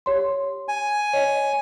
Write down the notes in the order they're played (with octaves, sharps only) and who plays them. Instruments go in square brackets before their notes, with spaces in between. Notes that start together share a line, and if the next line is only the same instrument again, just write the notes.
[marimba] G4 C#5 C6
[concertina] G#5
[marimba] C#5 D#5